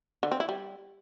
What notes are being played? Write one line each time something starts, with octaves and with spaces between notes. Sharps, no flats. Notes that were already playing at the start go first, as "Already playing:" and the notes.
D3
C4
E4
G3